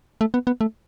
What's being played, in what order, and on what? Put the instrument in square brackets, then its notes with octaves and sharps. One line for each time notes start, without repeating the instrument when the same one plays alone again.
[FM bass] A3
B3
B3
A3